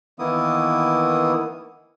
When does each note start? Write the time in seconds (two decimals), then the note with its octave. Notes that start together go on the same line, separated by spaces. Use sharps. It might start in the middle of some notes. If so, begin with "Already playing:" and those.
0.19 D#3 E3 A#3 B3 E4 D#6